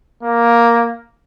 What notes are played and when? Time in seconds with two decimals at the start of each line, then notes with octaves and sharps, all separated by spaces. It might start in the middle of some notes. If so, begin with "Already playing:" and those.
0.23 A#3